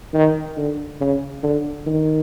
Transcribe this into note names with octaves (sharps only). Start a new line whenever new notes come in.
D#3
D3
C#3
D3
D#3